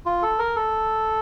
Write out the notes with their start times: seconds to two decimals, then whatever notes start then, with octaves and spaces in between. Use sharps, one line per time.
0.06 F4
0.22 A4
0.39 A#4
0.56 A4